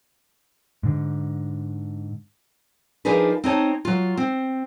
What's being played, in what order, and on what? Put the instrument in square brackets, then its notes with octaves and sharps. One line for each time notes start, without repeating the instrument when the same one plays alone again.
[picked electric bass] G#2 D3
[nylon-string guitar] F3 D4 D#4 G#4 A#4 B4
C4 D#4 C#5 A5
F#3 F4
C4